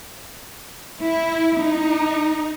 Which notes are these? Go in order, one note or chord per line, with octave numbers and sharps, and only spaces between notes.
E4
D#4